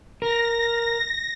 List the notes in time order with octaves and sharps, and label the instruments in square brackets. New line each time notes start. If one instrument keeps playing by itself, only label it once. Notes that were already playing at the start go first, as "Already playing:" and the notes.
[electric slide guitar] A#4 [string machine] A#6